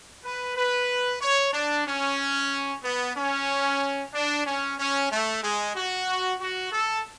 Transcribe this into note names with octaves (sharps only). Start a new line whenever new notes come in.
B4
B4
C#5
D4
C#4
B3
C#4
D4
C#4
C#4
A3
G#3
F#4
F#4
A4